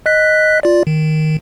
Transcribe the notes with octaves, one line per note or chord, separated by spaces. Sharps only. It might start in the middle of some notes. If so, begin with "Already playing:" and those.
D#5 F#6 B6
F4 D5
D#3